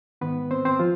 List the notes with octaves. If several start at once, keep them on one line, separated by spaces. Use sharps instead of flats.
G#2 D#3 B3 B4
C4 C5
C4 C5
F3 F4